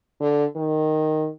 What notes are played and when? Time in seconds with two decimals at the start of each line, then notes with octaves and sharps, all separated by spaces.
0.21 D3
0.56 D#3